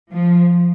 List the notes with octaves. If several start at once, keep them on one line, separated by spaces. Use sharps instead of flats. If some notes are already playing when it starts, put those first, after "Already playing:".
F3